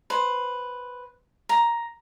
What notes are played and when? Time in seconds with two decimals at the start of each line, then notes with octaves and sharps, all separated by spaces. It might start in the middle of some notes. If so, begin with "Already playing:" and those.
0.10 B4 C5
1.49 A#5